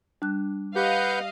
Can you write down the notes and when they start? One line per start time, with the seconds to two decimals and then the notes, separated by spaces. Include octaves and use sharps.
0.22 G3 D4 F#6
0.76 G4 B4 D#5 F5 F#5 G6